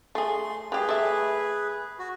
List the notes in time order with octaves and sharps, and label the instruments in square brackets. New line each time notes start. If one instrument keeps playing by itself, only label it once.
[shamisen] A3 G#4 [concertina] C6
[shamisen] G3 G4 [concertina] G#4 B4
[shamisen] A3 E5
[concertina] F#4